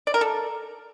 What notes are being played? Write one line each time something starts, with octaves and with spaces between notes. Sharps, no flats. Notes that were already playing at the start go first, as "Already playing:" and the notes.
D5
A#4
A4